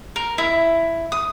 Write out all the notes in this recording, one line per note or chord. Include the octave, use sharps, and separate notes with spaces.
A#4
E4 E5
D#6